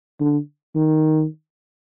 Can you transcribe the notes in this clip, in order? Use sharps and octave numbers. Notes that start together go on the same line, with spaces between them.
D3
D#3